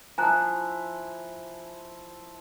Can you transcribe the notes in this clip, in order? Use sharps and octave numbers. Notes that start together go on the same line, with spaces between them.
F3 E4 G#5 A#5 F#6